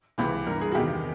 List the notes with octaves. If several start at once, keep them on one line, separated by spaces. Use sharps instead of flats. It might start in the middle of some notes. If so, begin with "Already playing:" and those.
C#2 C3 E3
G2 A#4
E3
G#4
F#4
E2 C3 D#3 G4